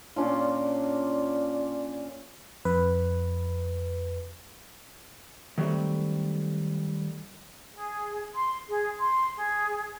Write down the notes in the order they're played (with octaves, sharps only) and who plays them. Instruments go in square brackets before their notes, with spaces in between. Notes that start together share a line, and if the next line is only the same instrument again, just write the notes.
[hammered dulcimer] A#2 C#4 D4 F4
[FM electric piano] F2 B4
[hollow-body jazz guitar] D#3 F#3 G3 A3 C4
[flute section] G#4
C6
G#4
C6
G#4